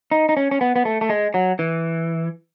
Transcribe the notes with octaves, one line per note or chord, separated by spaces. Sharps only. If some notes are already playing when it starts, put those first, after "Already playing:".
D#4
D#4
C#4
C#4
B3
B3
A3
A3
G#3
F#3
E3